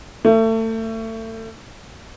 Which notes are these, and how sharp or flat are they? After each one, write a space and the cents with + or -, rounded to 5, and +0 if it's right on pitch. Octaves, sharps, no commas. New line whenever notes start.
A3 +30